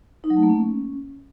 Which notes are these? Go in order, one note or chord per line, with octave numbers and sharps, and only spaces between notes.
D#4
F#3
A3
A#3
C#4